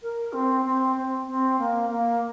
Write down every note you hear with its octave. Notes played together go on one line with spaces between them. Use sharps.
A#4
C4
C4
C4
C4
A#3
A#3